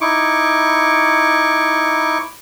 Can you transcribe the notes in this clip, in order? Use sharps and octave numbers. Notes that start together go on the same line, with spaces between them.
D#4 E4 C#6 D6